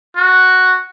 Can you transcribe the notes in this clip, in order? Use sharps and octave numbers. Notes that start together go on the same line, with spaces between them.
F#4